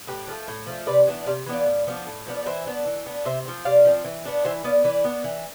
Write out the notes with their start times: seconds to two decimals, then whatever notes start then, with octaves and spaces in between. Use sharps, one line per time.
0.07 A2 G4 B4
0.28 F3 A3
0.48 A2
0.67 F3 A3
0.87 C3 B4 D5
1.07 E3 B3 D4
1.26 C3 D5 F5
1.46 E3 B3 D4
1.53 D5 F5
1.66 A2
1.87 F3 B3 D4
2.07 A2
2.27 F3 B3 D4
2.36 D5
2.46 E3 C5 E5
2.66 B3 D4
2.86 E3
3.06 B3 D4
3.25 C3 C5 E5
3.45 F3 C4
3.65 C3 D5 F5
3.85 F3 C4
4.05 E3
4.25 B3 D4
4.45 E3 C5 E5
4.64 B3 D4 D5 F5
4.84 E3 B4 D5
5.04 B3 D4
5.24 E3